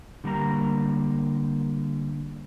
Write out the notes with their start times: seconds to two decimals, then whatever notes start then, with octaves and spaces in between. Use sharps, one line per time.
0.24 D3 G3 A#3 A#5